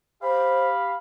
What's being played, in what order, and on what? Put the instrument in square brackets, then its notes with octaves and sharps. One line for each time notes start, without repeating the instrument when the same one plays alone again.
[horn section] G4 F5 B5 [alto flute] C5